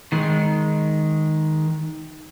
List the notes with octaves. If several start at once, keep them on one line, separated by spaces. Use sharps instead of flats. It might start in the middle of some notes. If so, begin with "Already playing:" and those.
D#3 G#3